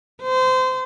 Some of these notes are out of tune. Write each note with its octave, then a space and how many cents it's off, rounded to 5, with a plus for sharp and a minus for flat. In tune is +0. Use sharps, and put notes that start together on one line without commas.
C5 -25